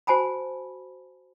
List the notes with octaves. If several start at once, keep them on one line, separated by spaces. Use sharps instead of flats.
F#4 C5 G#5 A5 B5